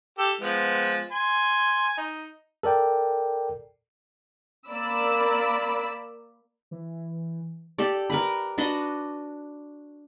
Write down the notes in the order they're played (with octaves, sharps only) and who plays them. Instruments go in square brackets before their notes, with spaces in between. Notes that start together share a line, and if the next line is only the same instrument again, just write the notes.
[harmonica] G4 A4
F3 G#3 B3
G#5 C6
D#4
[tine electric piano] A4 A#4 D5 G5
[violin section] A#3 D5 B5 E6
[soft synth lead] E3
[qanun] G4 A4 D5
A#4 B4 B5
D4 F#4 B4 D#5